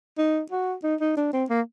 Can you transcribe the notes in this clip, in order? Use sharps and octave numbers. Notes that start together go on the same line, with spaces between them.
D#4
F#4
D#4
D#4
D4
C4
A#3